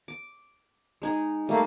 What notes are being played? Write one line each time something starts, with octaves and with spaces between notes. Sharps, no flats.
D6
G#3 D#4 G#4
G3 A3 A#3